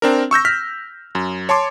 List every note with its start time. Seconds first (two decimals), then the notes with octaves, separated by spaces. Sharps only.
0.02 C4 D4 A#4
0.31 C#6 E6 G6 A#6
0.45 F6 B6
1.15 F#2
1.49 C#5 A5 C6 D6